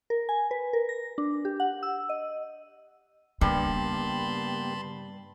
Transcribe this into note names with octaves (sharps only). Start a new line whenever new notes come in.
A#4
G#5
B4
A#4
A#6
D4
G4
F#5
E6
D#5
G2 C#3 A#3 B3 G4 A5 B5 C6